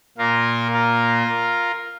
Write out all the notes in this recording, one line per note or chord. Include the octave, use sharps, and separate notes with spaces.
A#2 A#3 F4 A#4
F4 A#4